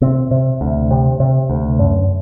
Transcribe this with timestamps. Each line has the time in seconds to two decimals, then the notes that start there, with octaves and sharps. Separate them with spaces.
0.01 C3 C4
0.31 C3
0.61 D2
0.91 C3
1.20 C3
1.50 D2
1.79 F#2